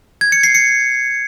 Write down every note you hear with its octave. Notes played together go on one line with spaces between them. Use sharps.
G#6
C#7
C7
C#7